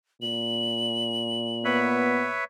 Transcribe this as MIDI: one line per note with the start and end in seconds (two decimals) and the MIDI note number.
0.22 2.39 46
0.22 1.78 102
1.65 2.28 59
1.65 2.44 71
1.65 2.44 73
1.65 2.44 76